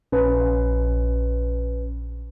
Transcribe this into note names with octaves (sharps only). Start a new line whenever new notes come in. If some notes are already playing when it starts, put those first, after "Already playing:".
A#1 C#4 B4